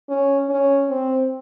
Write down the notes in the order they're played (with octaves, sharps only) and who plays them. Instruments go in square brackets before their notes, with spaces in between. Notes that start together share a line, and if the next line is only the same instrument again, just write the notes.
[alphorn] C#4
C#4
C4